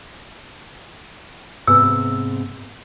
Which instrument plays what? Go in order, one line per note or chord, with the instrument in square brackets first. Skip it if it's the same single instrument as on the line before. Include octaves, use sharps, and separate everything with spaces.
[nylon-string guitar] G#2 C3 B3 [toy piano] E6